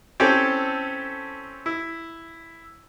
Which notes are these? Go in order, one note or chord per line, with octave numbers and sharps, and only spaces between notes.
C4 C#4 E4 G4 A4
E4